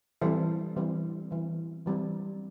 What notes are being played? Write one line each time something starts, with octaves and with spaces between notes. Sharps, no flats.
E3 G3 C4 A4 C5
E3 G3 C4
E3 G3 C4
E3 G3 C4